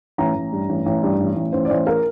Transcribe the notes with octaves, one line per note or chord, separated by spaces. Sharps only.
A1 A#5
A1
G2
A1
A1
G2
A1
A1
A1 C5
D5
A1 C5
A#4